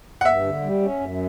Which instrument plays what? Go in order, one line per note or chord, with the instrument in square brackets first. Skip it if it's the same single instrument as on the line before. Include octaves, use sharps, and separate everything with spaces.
[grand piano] F#5
[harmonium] G2 [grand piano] E5
[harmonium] D3
G3
C#4
F#2